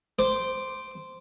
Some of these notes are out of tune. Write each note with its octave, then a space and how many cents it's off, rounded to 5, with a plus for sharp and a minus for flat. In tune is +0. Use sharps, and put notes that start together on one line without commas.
C5 -10 D6 +5